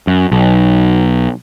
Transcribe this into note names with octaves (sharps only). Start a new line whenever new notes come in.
F#2
B1